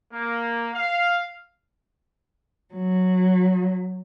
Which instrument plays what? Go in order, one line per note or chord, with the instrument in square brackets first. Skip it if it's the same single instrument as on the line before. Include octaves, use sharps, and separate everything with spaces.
[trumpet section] A#3
F5
[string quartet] F#3